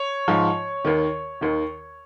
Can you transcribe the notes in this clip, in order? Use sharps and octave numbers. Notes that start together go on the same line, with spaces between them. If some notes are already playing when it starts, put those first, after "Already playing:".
Already playing: C#5
G#2 F3
D#2 D#3
D#2 D#3